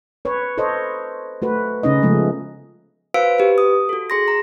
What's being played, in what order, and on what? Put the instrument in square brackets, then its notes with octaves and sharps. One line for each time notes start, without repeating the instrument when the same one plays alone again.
[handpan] B4 C#5
A4 C5 C#5 D#5
A3 F#4 B4
C#3 C#4 D#4 D#5
C#3 F3 G#3 A3 B3
[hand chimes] F#4 B4 C5 F5 E6 D7
G4 B4
D#6
F#4 A4
G#4 C6 A#6
A#5